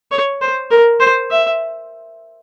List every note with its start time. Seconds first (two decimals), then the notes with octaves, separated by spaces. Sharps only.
0.11 C#5
0.41 C5
0.71 A#4
1.00 C5
1.30 E5